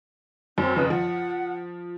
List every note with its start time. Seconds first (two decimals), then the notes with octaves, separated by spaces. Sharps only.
0.58 F#2 C4
0.76 F2 C#3 B4
0.90 F3 F#5